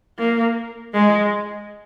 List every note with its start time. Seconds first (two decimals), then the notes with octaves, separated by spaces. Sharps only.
0.19 A#3
0.93 G#3